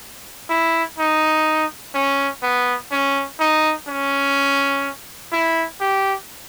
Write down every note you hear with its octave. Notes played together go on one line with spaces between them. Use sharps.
E4
D#4
C#4
B3
C#4
D#4
C#4
E4
G4